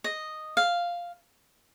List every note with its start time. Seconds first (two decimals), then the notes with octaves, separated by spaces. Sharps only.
0.04 D#5
0.57 F5